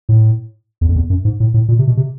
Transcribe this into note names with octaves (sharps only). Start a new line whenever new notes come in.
A2
E2
F2
E2
F#2
G#2
A2
A2
A#2
C3
B2
C3